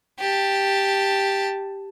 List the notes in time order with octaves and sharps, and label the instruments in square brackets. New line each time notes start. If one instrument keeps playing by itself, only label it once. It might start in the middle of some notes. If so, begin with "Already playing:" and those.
[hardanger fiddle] G4 A5